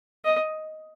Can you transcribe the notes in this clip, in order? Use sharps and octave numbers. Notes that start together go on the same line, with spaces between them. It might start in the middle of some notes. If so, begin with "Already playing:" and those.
D#5